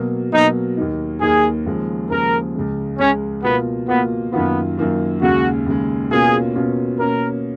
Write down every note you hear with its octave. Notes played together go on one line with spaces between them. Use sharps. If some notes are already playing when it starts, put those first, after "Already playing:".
Already playing: B2 F#3 A#3
B2 F#3 A#3 D#4
D#2 D#3 A#3 D#4
D#2 D#3 A#3 D#4 G#4
D#2 C#3 F3 G#3
D#2 C#3 F3 G#3 A#4
C#2 C#3 G#3
C#2 C#3 G#3 C#4
B2 A#3 B3 F4
B2 A#3 B3 F4
F#2 D#3 A#3 B3 F4
F#2 D#3 A#3 F4
D#2 C#3 G#3 F#4
D#2 C#3 G#3
B2 A#3 C#4 F4 G#4
B2 A#3 C#4 F4
B2 A#3 C#4 A#4